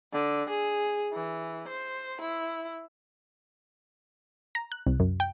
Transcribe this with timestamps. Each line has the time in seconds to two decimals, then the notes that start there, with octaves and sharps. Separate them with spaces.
0.13 D3
0.50 G#4
1.13 E3
1.68 C5
2.21 E4
4.55 A#5
4.72 F#6
4.87 C2
5.00 F#2
5.20 G5